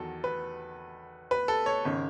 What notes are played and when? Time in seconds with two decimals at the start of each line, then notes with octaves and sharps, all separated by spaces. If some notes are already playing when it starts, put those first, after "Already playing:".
Already playing: E2 D#3 F#3 A4
0.24 B4
1.31 B4
1.48 A4
1.66 C#5
1.85 G#1 C#3